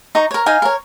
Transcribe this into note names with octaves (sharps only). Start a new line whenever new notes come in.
D#4 A#5 C#6
A#4 C#5
D#4 F5 G#5
A#4 C#5